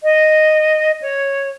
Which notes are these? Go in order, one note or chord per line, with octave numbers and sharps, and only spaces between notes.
D#5
C#5